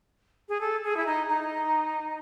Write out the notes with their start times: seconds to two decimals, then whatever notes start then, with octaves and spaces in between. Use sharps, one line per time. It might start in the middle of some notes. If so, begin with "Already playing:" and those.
0.49 G#4
0.61 A4
0.84 G#4
0.97 E4
1.06 D#4
1.29 D#4